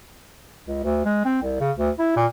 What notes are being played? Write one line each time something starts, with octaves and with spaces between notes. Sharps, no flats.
C#2
D2
G#3
C4
C2
C#3
D2
E4
A#2